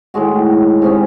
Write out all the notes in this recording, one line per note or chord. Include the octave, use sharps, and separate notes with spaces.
A2 D#3 G#3 F#4
G#2 C3 C#4